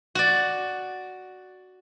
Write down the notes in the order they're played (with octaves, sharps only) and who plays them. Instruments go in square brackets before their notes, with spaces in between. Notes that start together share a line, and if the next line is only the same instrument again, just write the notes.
[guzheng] F#4 D5